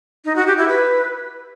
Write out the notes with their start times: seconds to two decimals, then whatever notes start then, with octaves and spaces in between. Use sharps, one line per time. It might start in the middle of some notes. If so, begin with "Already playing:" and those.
0.25 D#4
0.36 F#4
0.47 G4
0.58 E4
0.68 B4